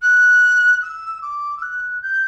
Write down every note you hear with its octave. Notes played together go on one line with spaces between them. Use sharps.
F#6
E6
D6
E6
F#6
G6